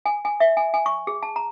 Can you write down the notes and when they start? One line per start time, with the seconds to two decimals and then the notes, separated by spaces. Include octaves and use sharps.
0.06 G#5
0.25 G#5
0.40 E5
0.57 G#5
0.74 G#5
0.86 C#6
1.07 G#4
1.23 A5
1.36 A#5